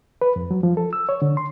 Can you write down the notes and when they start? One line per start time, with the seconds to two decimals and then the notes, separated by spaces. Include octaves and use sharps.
0.22 B4
0.36 F2
0.51 F#3
0.63 F3
0.77 A4
0.93 E6
1.09 C#5
1.22 D3
1.37 C6